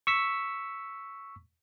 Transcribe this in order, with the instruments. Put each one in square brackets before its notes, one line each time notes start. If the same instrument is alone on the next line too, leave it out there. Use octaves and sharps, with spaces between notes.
[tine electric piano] C#6 E6 B6